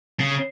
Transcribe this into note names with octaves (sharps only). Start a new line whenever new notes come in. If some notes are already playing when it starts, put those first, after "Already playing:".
C#3